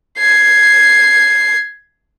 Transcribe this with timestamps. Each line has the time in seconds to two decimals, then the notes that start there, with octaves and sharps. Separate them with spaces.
0.17 G#6 C7